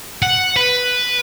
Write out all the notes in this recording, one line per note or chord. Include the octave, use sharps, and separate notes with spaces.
F#5
B4